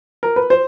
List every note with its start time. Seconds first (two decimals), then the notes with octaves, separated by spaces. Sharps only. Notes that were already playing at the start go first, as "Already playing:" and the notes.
0.23 A#4
0.36 B4
0.50 C5